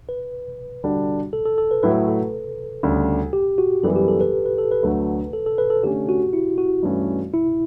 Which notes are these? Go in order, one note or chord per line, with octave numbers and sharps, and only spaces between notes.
B4
D3 G3 D4 F#4
A4
A4
A4
B4
A2 F#3 A3 E4 B4
A4
D2 C#3 G3
G4
F#4
F#2 E3 G3 B3 A4
G4
A4
B4
B4
A4
B4
D2 D3 F#3 A3
A4
A4
B4
A4
D3 A3 C#4 G4
F#4
E4
F#4
G2 E3 A3 C#4 F#4
E4